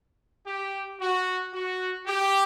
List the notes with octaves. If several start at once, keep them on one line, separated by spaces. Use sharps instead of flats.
G4
F#4
F#4
G4